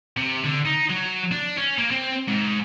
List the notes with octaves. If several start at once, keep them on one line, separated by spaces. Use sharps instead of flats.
C3
D3
D#4
F#3
D4
C#4
A#3
C4
G#2